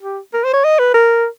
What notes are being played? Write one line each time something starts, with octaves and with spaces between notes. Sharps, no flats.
G4
A#4
C5
C#5
D#5
B4
A#4